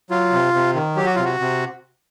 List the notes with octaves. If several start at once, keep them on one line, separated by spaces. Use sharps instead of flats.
F#3 F4
C3
C3
D#3
F#3 G4
F#4
C3 F4
F#4
C3